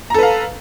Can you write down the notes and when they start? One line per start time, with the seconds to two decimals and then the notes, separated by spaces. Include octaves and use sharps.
0.10 A#5
0.14 A4
0.19 B4
0.23 F5